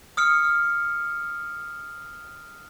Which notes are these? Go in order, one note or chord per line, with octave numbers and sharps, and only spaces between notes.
D#6 F6 C#7